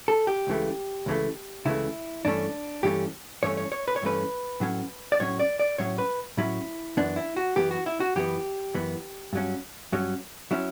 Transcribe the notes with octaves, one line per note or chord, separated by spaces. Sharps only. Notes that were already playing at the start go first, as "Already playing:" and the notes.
A4
G4
C#2 C#3 E3 A3
C#2 C#3 E3 A3
C#2 C#3 E3 A3 E4
G2 E3 A3 C#4 D4
G2 E3 A3 C#4 G4
G2 E3 A3 C#4 C#5
C#5
C#5
B4
C#5
G2 E3 A3 C#4 B4
A2 F#3 C#4
D5
A2 F#3 C#4 C#5
D5
D5
A2 F#3 C#4 C#5
B4
A2 F#3 C#4 E4
F#2 E3 B3 D4
E4
F#4
F#2 E3 B3 G4
F#4
E4
F#4
F#2 E3 B3 G4
F#2 E3 B3
G2 F#3 C#4
G2 F#3 C#4
F#3 C#4 E4